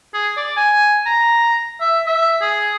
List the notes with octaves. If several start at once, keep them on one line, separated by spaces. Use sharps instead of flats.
G#4
D5
G#5
A#5
E5
E5
G#4